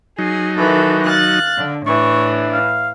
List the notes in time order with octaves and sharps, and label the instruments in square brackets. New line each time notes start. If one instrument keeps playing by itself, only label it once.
[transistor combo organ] F#3 D#4 [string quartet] G#4
[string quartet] D#3 E3 A4 [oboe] F#4
[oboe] F5 [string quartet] F#6 A6
[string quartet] D3
[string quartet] A2 E3 [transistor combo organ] D4 [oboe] C#6
[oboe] F5